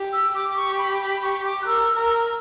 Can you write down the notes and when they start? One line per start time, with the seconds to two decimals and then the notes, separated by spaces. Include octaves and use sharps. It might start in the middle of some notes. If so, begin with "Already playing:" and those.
Already playing: G4
0.13 E6
0.35 G4 D6
0.49 D6
0.56 C#6
0.79 B5
1.01 B5
1.22 C#6
1.45 D6
1.62 F#6
1.67 A#4 E6
1.96 A#4
2.11 E6